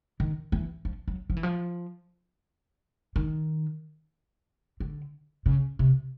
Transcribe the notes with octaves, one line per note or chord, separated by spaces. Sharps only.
D#3
E3
F3
F#3
F3
E3
F3
D#3
D3
C#3
C3